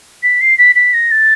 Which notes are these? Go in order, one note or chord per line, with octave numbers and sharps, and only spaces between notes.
B6
C7
B6
B6
A#6
A6